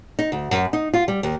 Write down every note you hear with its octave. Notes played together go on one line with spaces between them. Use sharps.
D#4
D2
F#2
D#4
F4
G3
D#2